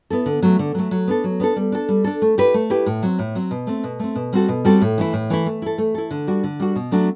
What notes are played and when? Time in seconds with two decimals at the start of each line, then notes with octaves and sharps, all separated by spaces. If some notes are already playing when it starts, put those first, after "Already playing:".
0.10 B3 E4 A4
0.26 D3
0.42 F#3 A3
0.59 D3
0.75 F#3 A3
0.91 F#3
1.08 B3 D4 A4
1.24 F#3
1.40 B3 D4 A4
1.56 G3
1.72 D4 A4
1.89 G3
2.04 D4 A4
2.22 A3
2.38 E4 G4 B4
2.54 A3
2.70 E4 G4 B4
2.86 A2
3.03 F#3 C4
3.19 A2
3.35 F#3 C4
3.51 B2
3.67 A3 C4
3.84 B2
3.99 A3 C4
4.15 B2
4.33 G3 C4 F#4 A4
4.48 B2
4.65 G3 C4 F#4 A4
4.82 A2
4.98 E3 A3 E4
5.13 A2
5.30 E3 A3 E4
5.46 A3
5.62 E4 A4
5.78 A3
5.94 E4 A4
6.11 D3
6.27 G3 D4 F#4
6.44 D3
6.60 G3 D4 F#4
6.76 B2
6.92 F#3 A3 D4 F#4